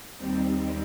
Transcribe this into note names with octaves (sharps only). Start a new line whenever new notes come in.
D#2 D#3 G3 C4